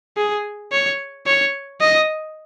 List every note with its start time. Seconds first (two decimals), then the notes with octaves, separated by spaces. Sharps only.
0.17 G#4
0.72 C#5
1.27 C#5
1.81 D#5